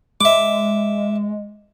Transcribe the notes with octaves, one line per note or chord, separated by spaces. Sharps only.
G#3 E5 D6